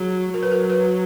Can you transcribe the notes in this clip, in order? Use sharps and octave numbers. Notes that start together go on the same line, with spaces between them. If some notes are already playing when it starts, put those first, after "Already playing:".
Already playing: F#3 G#4
F#3 A#4
B4
A#4
B4